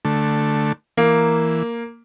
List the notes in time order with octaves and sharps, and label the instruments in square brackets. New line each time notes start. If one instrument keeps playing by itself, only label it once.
[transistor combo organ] D3 A3
[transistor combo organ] E3 [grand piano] A#3